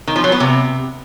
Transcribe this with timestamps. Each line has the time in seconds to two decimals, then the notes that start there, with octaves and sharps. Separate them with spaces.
0.07 D#3
0.16 F3
0.24 F#3
0.32 B3
0.40 C3